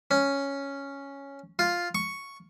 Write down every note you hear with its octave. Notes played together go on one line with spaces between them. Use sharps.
C#4
F4
C#6